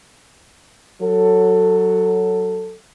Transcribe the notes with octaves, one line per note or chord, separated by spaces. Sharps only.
F#3 A4